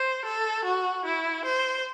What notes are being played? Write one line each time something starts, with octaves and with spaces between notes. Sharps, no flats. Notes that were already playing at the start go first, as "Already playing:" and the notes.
Already playing: C5
A4
F#4
E4
C5